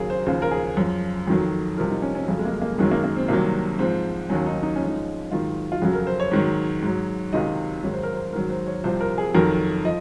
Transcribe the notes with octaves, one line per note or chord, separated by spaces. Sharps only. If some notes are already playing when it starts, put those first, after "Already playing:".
Already playing: D#2 C#3 F#3 G#4 A#4
C5
D#2 C#3 F3 C5
A#4
G#4
F#2 F3
F2 D#3 F#3
C2 C3 F3 A#4
D#4
C#4
C#4
F2 C#3 F#3
G#3
A#3
A#3
F#2 D#3 F#3 G#3
A#3
A#3
C4
C2 C3 D#3 F#3 A#3
G#2 F3 C4
D#2 D#3 F#3 C#4
D#4
D#4
C#4
G#2 F3
D#4
G#2 D#3 F#3 F4
F4
F2 C#3 F#3 F#4
A#4
C5
C#5
G#2 D#3 F#3
G#2 F#3
C#2 C3 D#3 F#3 D#5
G#2 D#3 F#3 C#5
C5
A#4
C5
G#2 D#3 F#3 A#4
C5
C#5
C2 C3 F3 C5
A#4
G#4
F2 D#3 F#3 A#4
F3 D#5